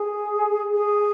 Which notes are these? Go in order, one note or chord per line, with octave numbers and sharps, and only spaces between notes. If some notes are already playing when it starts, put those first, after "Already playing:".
Already playing: G#4
G#4